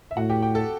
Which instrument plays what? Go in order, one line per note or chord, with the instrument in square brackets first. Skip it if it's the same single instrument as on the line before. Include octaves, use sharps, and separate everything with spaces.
[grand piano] E5
[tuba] A2 [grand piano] F#4 F#5
[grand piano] G4 G5
G4 G5
A4 A5